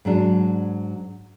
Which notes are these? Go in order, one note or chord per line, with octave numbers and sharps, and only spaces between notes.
G#2 F#3 D4